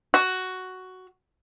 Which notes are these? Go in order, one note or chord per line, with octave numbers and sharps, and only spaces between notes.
F#4